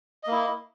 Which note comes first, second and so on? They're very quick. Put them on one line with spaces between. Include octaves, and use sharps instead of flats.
D#5 A#3 E4